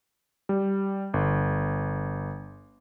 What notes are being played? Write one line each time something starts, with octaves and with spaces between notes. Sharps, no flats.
G3
G1